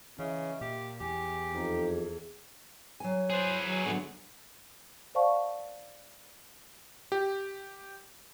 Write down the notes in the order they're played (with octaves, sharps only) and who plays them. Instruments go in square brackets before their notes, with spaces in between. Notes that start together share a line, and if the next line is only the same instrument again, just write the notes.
[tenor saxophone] C#3 [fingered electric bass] E3 [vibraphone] D#5 E5
[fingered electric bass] A#2 [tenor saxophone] G4
[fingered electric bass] E2 [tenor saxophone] G4 [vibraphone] G#5
[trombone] F2 [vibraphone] D#4 A4 A#5
[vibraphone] G#4
[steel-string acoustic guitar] F#3 G#5
[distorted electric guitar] G#4 B4 [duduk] C5
[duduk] F#3
[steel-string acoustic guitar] D3 F3 F#3 [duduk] B3
[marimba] C5 D5 F5 F#5 A5 C#6
[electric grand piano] G4